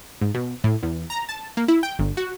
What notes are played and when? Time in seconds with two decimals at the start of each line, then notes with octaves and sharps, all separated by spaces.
0.21 G#2
0.34 B2
0.64 A2
0.83 E2
1.10 A#5
1.29 A5
1.57 A#3
1.68 E4
1.83 G5
1.99 G1
2.17 F#4